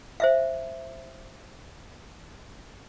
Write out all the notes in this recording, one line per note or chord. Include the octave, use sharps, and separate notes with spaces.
C5 E5 F5